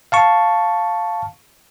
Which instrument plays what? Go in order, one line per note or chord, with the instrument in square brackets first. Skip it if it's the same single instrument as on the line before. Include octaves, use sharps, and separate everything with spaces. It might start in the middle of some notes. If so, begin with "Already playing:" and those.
[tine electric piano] F5 A5 C#6